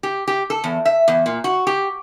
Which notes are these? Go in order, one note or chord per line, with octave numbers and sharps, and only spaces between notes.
G4
G4
A4
E2
E5
E2
A#2
F#4
G4